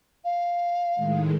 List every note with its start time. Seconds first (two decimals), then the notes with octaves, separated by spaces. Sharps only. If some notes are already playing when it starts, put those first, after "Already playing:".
0.24 F5
0.95 A2 D#3 G#3